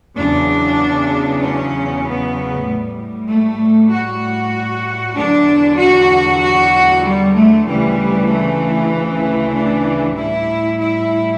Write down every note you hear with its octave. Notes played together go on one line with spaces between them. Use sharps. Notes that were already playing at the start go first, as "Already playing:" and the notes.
E2 C#3 F#3 D4
C#4
B3
A2 G3
A3
F#4
E2 D3 F#3 D4
F#4
F#4
G3
A3
D2 C#3 E3 G3
A3
A3
D4
A2 G3 E4
E4